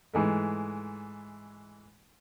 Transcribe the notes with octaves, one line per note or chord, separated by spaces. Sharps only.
G#2 E3 G#3 A3